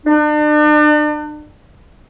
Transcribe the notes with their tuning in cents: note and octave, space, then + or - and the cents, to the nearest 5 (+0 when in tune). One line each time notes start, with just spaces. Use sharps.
D4 +40